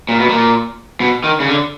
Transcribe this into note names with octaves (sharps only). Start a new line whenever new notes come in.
A#2
B2
A#2
B2
D#3
C#3
D3